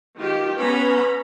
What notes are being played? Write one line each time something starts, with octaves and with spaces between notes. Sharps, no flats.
D#3 F4 G4
B3 C#4 A#5 B5